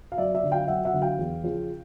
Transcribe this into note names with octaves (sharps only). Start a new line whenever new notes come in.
F5
F#2 D5 E5
D5 E5
D3 F#3
F5 G5
F#2 E5 F#5
E5 F#5
D3 F#3
F5 G5
E2
C#3 F3